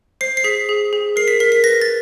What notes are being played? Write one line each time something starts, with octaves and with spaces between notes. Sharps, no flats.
C5 C7
C7
G#4 B6
G#4
G#4
A#4 C7
B6
A#4 B6
B6
B4 A#6
A6